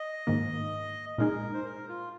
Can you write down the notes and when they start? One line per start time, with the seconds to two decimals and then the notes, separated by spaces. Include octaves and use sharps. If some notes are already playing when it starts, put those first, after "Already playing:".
Already playing: D#5
0.27 G#2 D#3 A#3
1.18 A#2 G#3 D#4 G#4 A#4
1.54 C5
1.65 A#4
1.88 F4